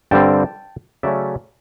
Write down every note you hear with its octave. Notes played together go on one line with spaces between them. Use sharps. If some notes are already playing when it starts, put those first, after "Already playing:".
G2 D3 G3 C4 G5 A5
C#3 F#3 A3 C#4 D5 E5